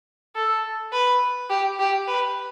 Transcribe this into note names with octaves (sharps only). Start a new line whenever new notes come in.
A4
B4
G4
G4
B4